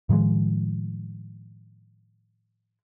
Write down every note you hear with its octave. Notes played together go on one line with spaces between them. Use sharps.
A2 D#3 F3 G#3